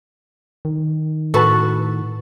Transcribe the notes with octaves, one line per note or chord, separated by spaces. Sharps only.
D#3
A2 F#4 A4 B4 A5